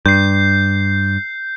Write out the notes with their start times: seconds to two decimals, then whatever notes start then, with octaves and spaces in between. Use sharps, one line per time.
0.06 G2 G6 C7